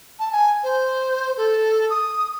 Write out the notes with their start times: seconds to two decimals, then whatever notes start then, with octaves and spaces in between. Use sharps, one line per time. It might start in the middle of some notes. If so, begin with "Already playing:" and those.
0.19 A5
0.32 G#5
0.64 C5
1.37 A4
1.90 D#6